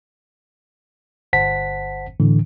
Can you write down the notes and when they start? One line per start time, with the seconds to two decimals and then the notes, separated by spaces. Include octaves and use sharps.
1.33 G1 C5 F#5 A5 B6
2.20 A2 D3 E3